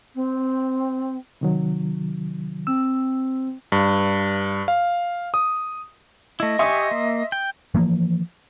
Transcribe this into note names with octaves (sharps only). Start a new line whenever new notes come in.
C4
C3 D#3 F#3
C4 E6
G2
F5
D#6
A3 E4 D#5
G4 E5 G#5 C6 C#6 D#6
A#3
G5
E3 F3 A#3